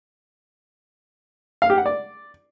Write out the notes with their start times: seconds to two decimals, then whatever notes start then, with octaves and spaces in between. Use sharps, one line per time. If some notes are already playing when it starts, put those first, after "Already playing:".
1.62 F5
1.70 G4
1.78 F#5
1.86 D5